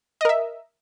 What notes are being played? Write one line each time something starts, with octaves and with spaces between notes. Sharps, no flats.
A#4 D#5 E5